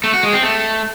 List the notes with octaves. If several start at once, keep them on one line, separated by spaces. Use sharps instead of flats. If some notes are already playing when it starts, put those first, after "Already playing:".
A3
F#4
G#3
C4
A3